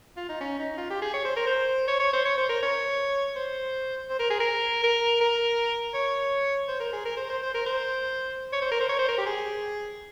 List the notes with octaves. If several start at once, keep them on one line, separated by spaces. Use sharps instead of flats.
F4
D#4
C#4
D#4
F4
G4
G#4
C#5
C5
A#4
C5
C#5
C#5
C5
C#5
C5
A#4
C#5
C5
C5
A#4
G#4
A#4
A#4
A#4
C#5
C5
A#4
G#4
A#4
C5
C5
C5
A#4
C5
C#5
C5
A#4
C5
C#5
C5
A#4
G4
G#4